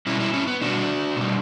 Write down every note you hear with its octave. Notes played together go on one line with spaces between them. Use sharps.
B2 G3 C#4 E4
C#4 E4
C#4 E4
B3
B2 G3 D4 F#4
B2 G3